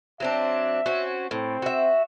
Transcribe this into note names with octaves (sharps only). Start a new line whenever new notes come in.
F#3 C4 D4 E5
C4 C#4 F#4
A2 C4
F#4 E5